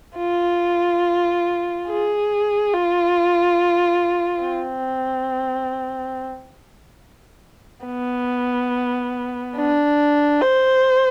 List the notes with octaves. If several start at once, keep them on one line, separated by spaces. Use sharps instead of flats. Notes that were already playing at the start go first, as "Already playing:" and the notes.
F4
G#4
F4
C4
B3
D4
C5